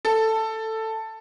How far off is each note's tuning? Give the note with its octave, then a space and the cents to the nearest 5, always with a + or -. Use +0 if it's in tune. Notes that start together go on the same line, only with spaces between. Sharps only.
A4 +10